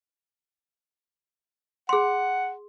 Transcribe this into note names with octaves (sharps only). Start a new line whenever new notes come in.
G#4 F#5 C6